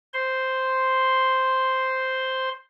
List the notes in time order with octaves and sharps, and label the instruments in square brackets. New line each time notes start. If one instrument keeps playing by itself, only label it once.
[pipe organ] C5 C6